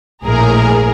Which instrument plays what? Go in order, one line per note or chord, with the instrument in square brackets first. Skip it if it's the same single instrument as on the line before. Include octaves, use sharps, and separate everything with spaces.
[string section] A#1 A2 G#4 A#4